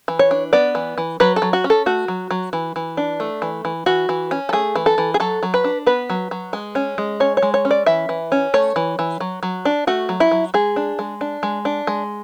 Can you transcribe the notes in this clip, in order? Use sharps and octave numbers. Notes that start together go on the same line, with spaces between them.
E3
C#5
D4
B3 D5
E3
E3
F#3 B4
A4
F#3
F#4
C#4
A4
A3 F#4
F#3
F#3
E3
E3
D4
A3
E3
E3
E3 F#4
E3
C#4
A4
A3 G#4
E3
A4
E3
G#4
F#3 A4
F#3
B4
D4
B3 B4
F#3
F#3
G#3
C#4
G#3
C#4 C#5
C#5
G#3
C#5
C#4
D5
E3 E5
E3
C#4
A3 C#5
E3
E3
F#3
F#3
D4
A3 F#4
F#3
E4
F#3
G#3 G#4
D4
G#3
D4
G#3
D4
G#3